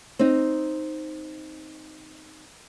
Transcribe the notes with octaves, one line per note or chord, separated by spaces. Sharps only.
C4 D#4